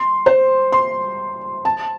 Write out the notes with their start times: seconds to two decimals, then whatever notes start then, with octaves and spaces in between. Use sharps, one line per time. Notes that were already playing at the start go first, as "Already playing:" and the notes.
Already playing: C6
0.26 C5
0.72 C6
1.65 A5